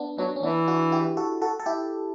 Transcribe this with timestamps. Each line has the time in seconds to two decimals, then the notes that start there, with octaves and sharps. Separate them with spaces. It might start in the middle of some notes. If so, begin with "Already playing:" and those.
Already playing: B3 D4
0.18 F#3 B3 D4
0.36 C#4
0.42 E3 B3 D4
0.67 D4 F#4
0.92 E4 G4
1.17 F#4 A4
1.42 F#4 A4
1.60 A4
1.66 E4 G4